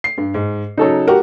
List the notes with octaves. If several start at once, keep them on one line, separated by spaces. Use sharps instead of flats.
C7
G2
G#2
C#3 F#3 D#4 A4 C#5
F#4 G4 A#4 F#5